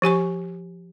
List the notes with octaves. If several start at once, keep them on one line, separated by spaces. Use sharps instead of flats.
F3 G4 G#5 C#6